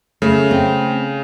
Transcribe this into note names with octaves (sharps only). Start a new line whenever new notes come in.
C#3 A3
C4